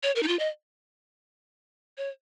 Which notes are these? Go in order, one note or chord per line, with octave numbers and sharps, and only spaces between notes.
C#5
A#4
D#4
F4
D#5
C#5